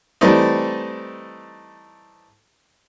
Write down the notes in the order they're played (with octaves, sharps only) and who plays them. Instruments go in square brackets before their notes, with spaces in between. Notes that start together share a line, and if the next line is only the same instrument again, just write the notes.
[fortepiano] E3 G3 A3 C4 D#4